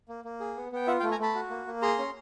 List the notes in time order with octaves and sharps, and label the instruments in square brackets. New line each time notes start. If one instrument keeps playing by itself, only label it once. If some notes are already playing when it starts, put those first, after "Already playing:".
[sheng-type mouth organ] A#3
A#3
G#4
B3
B3 G5
F4 E5 F#5
F5 G5
A3
G#5 A#5
A3 A5 B5
F#4
A#3
A#3
G#4 A#5 C6
C#4